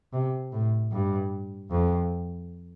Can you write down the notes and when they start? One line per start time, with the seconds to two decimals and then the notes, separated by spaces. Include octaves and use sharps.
0.13 C3
0.52 A2
0.91 G2
1.71 F2